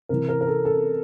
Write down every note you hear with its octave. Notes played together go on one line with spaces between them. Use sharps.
C3 E3 A#4
A#4
A#4
A4
A4